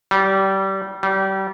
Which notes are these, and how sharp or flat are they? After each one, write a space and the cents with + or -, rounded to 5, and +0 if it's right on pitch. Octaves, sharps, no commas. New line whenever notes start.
G3 -25
G3 -30